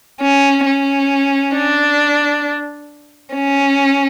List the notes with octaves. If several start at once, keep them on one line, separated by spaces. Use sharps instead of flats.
C#4
C#4
D4
C#4